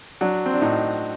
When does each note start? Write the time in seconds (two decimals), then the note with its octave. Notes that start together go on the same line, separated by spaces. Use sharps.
0.21 F#3 D4
0.46 C4
0.54 D4
0.61 A2 D#4